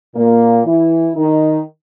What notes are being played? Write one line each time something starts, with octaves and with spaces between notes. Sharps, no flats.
A#2 A#3
E3 E4
D#3 D#4